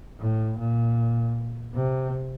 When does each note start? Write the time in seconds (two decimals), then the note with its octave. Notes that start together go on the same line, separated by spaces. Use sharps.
0.20 A2
0.58 A#2
1.75 C3